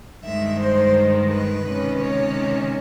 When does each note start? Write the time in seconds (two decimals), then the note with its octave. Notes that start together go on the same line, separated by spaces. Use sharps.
0.24 G2 D#3 G#3 E5
0.59 C5
1.29 B4
1.65 C3 D#3 G#3 C#4
2.00 C#5